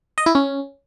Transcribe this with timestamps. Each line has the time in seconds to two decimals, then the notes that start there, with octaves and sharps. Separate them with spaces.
0.18 D#5
0.26 E4
0.35 C#4